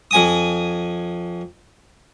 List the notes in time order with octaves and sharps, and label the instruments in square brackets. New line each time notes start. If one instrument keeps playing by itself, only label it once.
[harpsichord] F2 G#5 D#6